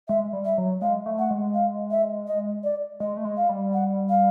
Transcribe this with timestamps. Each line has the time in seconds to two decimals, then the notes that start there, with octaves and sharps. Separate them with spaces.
0.08 G#3 E5
0.33 G3
0.45 E5
0.58 F#3
0.82 G#3 F5
1.06 A3
1.19 F#5
1.31 G#3
1.54 F5
1.91 E5
2.27 D#5
2.64 D5
3.00 G#3 D#5
3.17 A3
3.25 G#3
3.37 F5
3.49 G3
3.73 F#5
4.09 F5